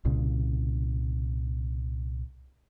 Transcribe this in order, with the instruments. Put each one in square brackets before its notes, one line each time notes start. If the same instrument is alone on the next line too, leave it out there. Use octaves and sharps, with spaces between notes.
[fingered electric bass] C2 A#2 C#3